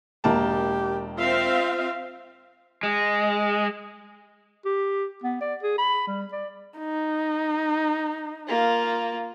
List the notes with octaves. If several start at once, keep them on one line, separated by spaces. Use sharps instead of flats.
E1 A#3 G4 A5
C4 F4 E5 F5
G#3
G4
B3
D5
G#4
B5
G3
D5
D#4
A#3 F4